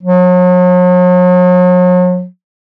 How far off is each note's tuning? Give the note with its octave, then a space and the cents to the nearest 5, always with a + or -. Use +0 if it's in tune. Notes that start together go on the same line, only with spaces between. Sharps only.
F#3 -40